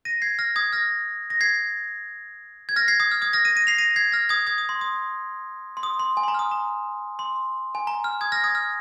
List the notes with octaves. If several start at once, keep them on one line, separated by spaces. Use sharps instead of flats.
A#6 D#7
G#6 C7
F6 A#6
D#6 G#6
F6 A#6
A#6
G#6 C7
G#6
F6 A#6
G#6 C7
D#6 G#6
F6
D#6 G#6
F6 A#6
A#6 D#7
A#6 D#7
C7 F7
A#6 D#7
G#6 C7
F6 A#6
D#6 G#6
D#6 G#6
D#6
C6
D#6
C6
D#6
C6
G#5
C6
A#5
F6
D#6
A#5
C6
G#5
A#5
F6
D#6 G#6
F6 A#6
D#6 G#6
F6